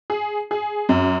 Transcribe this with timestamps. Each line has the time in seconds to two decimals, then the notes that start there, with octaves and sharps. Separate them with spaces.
0.10 G#4
0.51 G#4
0.89 F#2